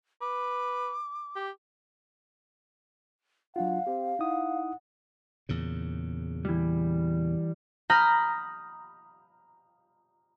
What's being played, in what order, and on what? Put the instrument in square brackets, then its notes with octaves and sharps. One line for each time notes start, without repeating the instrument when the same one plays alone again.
[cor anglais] B4 [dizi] D6
[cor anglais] G4
[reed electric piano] F#3 D4 F4 [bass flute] F5 [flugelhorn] F#5
[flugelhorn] C4 [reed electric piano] G4
[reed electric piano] D#4 E4 D#6 [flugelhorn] F#5
[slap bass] E2 A#2 C#3
[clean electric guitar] E3 G3
[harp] A#5 B5 D#6 F6 G6 A#6